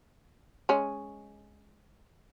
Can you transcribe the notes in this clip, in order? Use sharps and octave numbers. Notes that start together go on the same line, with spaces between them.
G#3 C#4